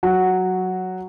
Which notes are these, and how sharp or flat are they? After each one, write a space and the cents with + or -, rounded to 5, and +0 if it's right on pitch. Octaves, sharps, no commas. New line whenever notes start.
F#3 +0 F#4 +0